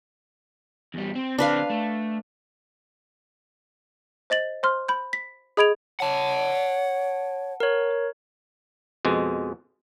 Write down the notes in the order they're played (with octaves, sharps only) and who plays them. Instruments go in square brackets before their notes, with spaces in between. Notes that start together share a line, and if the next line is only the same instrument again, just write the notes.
[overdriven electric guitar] E2 G3
C4
[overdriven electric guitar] D3 C4 [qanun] D4 B4 F5
[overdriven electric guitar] A3
[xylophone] C5 D#5 A6 F#7
C5 C6 F6
B5 G6
B6
G#4 D#5 B5 G#6 D7 F7
[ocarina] C#5 [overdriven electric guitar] F#5 A5
[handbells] A#4 C#5
[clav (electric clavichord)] F2 B2 G#3